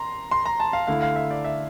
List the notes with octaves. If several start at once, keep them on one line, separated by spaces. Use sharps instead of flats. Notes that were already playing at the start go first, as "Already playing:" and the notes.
Already playing: A#5 C6
C6
A#5
A5
F5
D3 A3 E4 F5
F5
E5
D5
E5